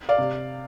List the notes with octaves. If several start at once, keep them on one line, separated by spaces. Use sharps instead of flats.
D5 F5
C3